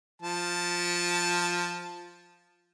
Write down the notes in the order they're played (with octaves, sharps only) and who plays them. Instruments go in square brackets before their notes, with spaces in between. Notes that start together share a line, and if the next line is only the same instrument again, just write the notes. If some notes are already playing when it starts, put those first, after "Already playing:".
[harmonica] F3 A5